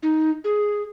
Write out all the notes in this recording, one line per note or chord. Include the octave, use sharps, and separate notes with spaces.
D#4
G#4